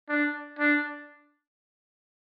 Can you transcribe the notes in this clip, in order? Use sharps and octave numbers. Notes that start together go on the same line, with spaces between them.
D4
D4